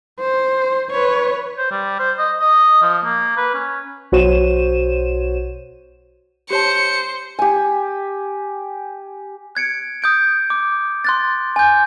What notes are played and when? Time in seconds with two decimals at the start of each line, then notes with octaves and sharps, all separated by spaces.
0.20 C5
0.91 B4 C#5
1.58 C5
1.71 G3
1.99 C5
2.18 D#5
2.40 D#5
2.82 F3
3.04 A#3
3.37 B4
3.54 C#4
4.12 B1 F#4 C5 C#5 D#7 E7
6.50 G4 C5 C#5 A5 C#7
7.39 G4 G#5
9.55 F#6 G#6 C#7 D7
10.02 D#6 G6 D7
10.50 D6
11.04 C6 F#6 A6
11.56 G#5 G6